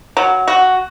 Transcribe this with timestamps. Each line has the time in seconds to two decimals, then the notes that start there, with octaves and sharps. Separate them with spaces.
0.17 F#3
0.48 F#4